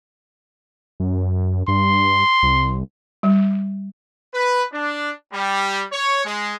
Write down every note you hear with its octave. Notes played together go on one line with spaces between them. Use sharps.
F#2
G2 C6
C2
G3
B4
D4
G3
C#5
G#3